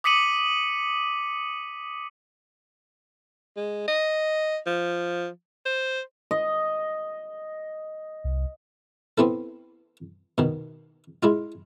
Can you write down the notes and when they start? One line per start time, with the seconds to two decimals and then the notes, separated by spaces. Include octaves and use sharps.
0.04 D6 D#6 B6 C#7 D#7 F#7
3.57 G#3
3.88 D#5
4.67 F3
5.66 C5
6.31 D#5
8.24 C2
9.18 B3 C4 E4 A4
10.38 B2 D#3
11.23 G#3 E4 F4